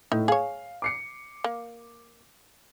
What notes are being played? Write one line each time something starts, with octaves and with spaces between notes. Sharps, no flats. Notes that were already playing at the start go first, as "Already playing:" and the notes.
A2 D#4
G#4 C#5 F5
D6 C7 C#7
A#3